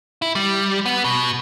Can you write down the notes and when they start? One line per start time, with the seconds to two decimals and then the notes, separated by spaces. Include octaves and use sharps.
0.22 E4
0.35 G3
0.86 B3
1.04 B2